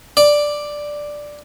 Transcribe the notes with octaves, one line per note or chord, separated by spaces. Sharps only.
D5